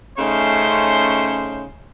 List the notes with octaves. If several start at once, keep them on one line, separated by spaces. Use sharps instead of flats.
C#3 A3 C#4 D#4 C5 C6